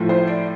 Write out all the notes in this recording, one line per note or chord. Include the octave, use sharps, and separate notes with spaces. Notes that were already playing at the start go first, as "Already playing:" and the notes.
Already playing: A2 F3 A3
C5
D5